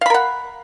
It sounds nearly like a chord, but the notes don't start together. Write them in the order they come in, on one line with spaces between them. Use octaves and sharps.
F5 B5 A#4 F#5